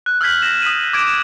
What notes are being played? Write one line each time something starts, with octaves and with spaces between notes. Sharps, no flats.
F#6
E6 F6 G6 G#6 B6 F#7
F6 A#6 E7
D#6 B6 D#7
D6 G#6 D7 E7